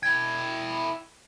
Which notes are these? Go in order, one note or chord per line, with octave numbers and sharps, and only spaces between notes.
E4 G5 G#6